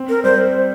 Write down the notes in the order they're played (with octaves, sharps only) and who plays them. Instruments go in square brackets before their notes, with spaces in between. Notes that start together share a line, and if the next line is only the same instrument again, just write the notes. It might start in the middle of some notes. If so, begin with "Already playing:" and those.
Already playing: [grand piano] C4
[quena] A#4
[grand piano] G3 [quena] C5